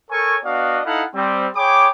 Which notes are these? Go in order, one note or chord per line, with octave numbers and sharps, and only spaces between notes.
A4 A#4 C#5 G#5 C#6
B3 D4 F#4 D5 D#5 F5
D#4 E4 A4 F5 F#5
G3 C4
G#4 C#5 G5 B5 D6